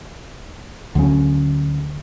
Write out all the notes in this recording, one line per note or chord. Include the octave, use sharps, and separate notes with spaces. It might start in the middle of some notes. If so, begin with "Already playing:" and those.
D2 D3 F#3 C#4